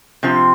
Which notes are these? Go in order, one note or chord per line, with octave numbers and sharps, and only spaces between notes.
C3 F3 C4